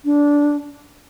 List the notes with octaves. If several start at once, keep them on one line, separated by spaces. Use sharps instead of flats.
D4